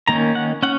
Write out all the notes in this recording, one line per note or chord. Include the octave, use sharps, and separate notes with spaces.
D#3 A#3 C#4 A#5
F#5
C#4 F#5